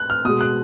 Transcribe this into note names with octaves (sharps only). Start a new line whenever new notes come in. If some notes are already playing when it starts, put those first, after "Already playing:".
Already playing: F#6
F6
B2 G#3 D#6
F#6